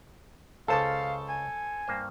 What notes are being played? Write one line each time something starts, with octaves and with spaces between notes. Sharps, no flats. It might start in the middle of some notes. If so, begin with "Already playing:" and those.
C#2 C#3 A4 C5 F5 A5
G#5
G2 A#3 C5